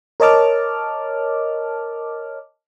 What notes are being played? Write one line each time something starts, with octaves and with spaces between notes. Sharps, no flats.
A#4 C#5 D#5 A5 D6 F6